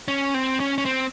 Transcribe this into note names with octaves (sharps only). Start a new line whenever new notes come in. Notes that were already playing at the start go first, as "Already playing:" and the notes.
C#4
C4
C#4
C#4
C4